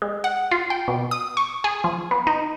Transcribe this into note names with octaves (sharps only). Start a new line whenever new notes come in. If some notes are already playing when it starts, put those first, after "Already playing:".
G#3
F#5
F4
G5
B2
D#6
C#6
G#4
F3
B3
D#4